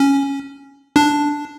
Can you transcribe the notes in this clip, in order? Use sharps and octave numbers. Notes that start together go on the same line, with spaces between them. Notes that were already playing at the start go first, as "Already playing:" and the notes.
Already playing: C#4
D4